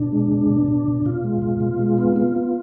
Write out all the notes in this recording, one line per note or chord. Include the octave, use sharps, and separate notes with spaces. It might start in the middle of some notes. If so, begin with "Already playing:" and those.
Already playing: B2 D4
G#3
B2
B2
B2
B2
B2 F4
G#3
B2
B2
G#3
B3
B3 F4
B3